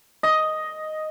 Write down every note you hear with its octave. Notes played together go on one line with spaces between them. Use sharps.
D#5